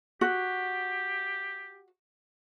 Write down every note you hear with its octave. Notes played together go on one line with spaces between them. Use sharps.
F#4 G4